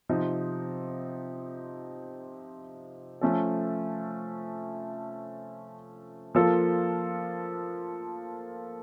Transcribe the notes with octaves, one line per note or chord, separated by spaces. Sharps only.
C3 F3 C4 D#4
F3 A3 C#4 A4
F3 A#3 F4 A4